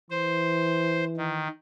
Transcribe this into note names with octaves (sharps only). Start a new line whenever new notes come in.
E3 C5
D#3